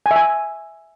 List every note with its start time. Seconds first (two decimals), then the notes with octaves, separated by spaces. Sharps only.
0.06 G#5
0.11 E5
0.16 G#5